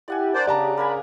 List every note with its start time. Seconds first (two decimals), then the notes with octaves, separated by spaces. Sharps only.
0.08 E4 G4 D5 F#5 G#5
0.34 D4 A#4 C5 D5
0.47 C#3 G4 D5 A5 A#5
0.77 A#3 A#4 G#5 B5